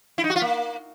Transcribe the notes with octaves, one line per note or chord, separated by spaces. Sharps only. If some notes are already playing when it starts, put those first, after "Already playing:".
E4
D#4
F#4
F4
A#3